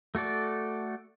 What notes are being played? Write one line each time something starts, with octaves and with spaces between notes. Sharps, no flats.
A3 F#4 A4 D5